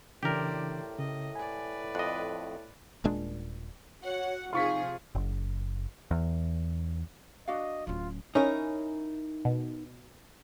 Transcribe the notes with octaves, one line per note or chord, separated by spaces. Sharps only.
A2 C#3 E3 D4 G4 A#4 C5 D5
C#3 D#5
B4 D5 G#5
F2 D#5 F#6
D#1 A#2 G#3 D4
F#4 C#5 F#5
C3 F3 D#4 F4 G#4 C#6 B6
F#1
E2
D4 F#4 D#5 F5
D1 C#4 F4
C#4 D#4 E4 A#4
B2